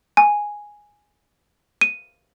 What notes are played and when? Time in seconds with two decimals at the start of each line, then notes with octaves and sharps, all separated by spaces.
0.17 G#5
1.81 D#7